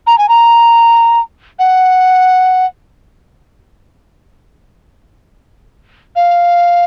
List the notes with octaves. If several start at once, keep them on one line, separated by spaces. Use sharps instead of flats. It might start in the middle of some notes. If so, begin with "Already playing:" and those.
A#5
G#5
A#5
F#5
F5